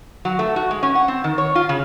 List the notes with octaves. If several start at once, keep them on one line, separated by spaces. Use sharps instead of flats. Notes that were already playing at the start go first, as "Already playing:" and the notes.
F#3
A3
F#4
G#3
C#4
F#5
C4
D#3
C#5
F4
C#3